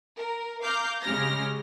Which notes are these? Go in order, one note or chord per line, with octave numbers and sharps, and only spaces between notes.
A#4
F5 A#5 D6 F6 G6
C#3 G#3 C#4 G4 F6 A#6